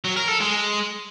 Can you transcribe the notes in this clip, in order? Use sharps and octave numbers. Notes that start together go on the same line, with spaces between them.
F#3
A#4
A4
G#3